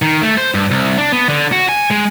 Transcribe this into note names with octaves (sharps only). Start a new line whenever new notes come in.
D#3
A3
C5
G2
C2
D4
B3
D3
F#4
G#5
G#3